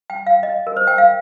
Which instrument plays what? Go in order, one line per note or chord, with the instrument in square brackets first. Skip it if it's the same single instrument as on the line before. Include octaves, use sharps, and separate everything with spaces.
[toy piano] G5
F5
D#5
A#4
C5
G5
F5